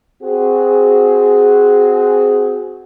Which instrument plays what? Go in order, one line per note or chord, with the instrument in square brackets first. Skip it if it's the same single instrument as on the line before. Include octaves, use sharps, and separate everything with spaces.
[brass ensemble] C4 F#4 G#4